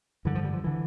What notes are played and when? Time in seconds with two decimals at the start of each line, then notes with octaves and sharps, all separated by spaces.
0.25 G2 D3 E3
0.35 F3
0.44 G3
0.53 F3
0.64 D3 E3